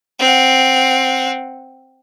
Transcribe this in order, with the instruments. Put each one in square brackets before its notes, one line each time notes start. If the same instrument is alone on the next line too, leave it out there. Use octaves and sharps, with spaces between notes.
[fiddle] C4 F#5